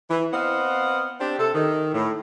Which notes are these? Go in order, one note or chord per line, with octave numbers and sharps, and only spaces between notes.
E3
B3 C4 D#5 F5 F#5
C4 D4 G4
C3 A4
D#3
A2